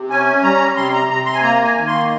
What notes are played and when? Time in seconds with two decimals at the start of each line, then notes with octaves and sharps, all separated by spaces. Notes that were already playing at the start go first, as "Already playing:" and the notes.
Already playing: C3
0.10 C#4 G#5
0.43 G3 A#5
0.76 C3 C6
0.93 A#5
1.09 C3 A#5
1.26 C6
1.34 G#5
1.42 A#3 A#5
1.64 G#5
1.75 D#3
1.87 C6